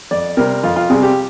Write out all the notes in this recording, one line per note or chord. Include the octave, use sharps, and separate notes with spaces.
F2 D5
C3 G3 C4 A#4
F2 F4
F4
C3 G3 C4 G#4
G4